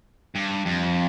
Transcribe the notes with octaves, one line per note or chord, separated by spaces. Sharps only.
G2
F2